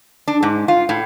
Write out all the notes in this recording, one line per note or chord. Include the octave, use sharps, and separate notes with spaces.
D4
G#2
F4
A2